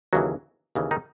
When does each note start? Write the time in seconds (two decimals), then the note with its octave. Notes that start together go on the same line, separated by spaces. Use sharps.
0.13 D#2 C#3 E3 F#3 F#4
0.75 D#2 C#3 E3
0.91 D#3 D#4